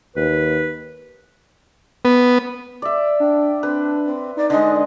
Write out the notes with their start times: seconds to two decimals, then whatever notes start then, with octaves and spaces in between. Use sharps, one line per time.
0.16 D#2 B4
2.05 B3
2.82 D5 E5
3.20 D4 G5
3.63 C4 B4
4.05 C4
4.37 D#4 D5
4.50 D3 G#3 D#5